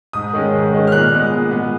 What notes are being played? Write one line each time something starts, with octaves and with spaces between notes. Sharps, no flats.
G#2 D#6
D#3 G#3 C#4
G#2
D#3 G#3 C#4
F6
A#2 F#6
G#3 B3
A#2
G#3 B3